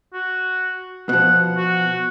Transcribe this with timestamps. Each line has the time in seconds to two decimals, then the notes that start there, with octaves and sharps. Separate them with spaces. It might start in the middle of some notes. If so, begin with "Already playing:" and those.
0.14 F#4
1.09 B2 F3 F#5
1.57 F#4